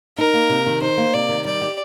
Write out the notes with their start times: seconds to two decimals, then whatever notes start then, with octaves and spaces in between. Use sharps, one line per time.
0.18 D#4 A#4
0.34 A#3
0.49 C3
0.66 D#3
0.82 D#4 C5
0.98 A#3
1.13 C3 D5
1.29 D#3
1.45 G3 D5
1.61 G4